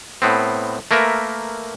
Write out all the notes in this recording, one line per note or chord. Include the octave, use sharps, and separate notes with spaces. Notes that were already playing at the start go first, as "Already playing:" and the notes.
A2 B3 C4
A3 A#3 A#4 B4 E5